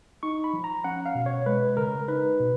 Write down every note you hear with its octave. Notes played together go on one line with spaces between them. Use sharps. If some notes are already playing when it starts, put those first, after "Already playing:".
D#4 C#6
B5
F3
A#5
C#4 F#5
F5
B2
C#5
G#3 B4
C#3 A#4
D#4 B4
B2